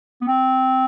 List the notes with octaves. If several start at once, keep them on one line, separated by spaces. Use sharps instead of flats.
B3
C4